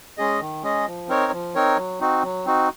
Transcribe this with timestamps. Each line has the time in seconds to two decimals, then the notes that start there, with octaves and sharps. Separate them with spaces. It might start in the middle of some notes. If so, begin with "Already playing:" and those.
0.18 G#3 C#4 G#4 D#5
0.40 D#3
0.63 G#3 C#4 G#4 D#5
0.86 F3
1.09 C4 D#4 A#4 C#5
1.32 F3
1.55 C4 D#4 A#4 C#5
1.77 F#3
2.00 C4 D#4 F#4
2.23 F#3
2.45 C4 D#4 F#4